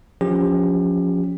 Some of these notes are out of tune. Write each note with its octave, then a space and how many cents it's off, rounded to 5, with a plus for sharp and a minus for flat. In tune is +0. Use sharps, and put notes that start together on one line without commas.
F3 +30 C#4 +15 G4 +30